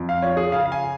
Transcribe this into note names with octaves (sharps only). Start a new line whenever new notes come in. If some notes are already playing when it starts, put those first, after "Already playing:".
Already playing: F2
F5
F3 C#5
G#4
C#3 F5
F5
G#5